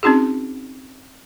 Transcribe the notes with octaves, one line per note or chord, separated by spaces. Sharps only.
C4 C#4 D#4 F#4 G#4